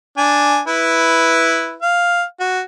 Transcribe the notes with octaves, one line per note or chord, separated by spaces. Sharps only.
D4 G#5
E4 B4
F5
F#4